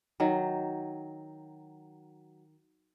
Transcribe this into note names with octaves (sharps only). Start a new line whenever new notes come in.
D#3 F#3